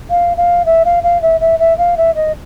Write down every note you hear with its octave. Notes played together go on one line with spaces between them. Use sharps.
F5
F5
E5
F5
F5
E5
E5
E5
F5
E5
D#5